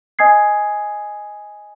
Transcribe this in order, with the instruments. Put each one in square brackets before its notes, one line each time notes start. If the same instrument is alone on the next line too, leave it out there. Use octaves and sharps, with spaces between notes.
[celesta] D#5 G#5 D#6 G#6 C7